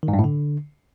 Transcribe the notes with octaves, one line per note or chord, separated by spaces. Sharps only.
D#3
G#2
G2
A2
D3